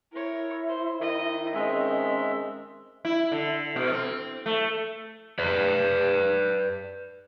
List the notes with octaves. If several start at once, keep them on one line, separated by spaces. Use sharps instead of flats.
E4 A#4 C#5
C5
D#3 D#5
G#3 C4 C#4 E5
E4
D3
B2
C4
A3
B4 D5